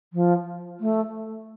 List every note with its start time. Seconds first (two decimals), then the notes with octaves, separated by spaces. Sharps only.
0.13 F3
0.80 A3